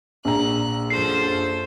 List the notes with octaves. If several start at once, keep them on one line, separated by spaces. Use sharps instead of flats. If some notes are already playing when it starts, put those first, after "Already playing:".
A#1 A#2 A#5 F#6
F#2 F3 A4 C5 C7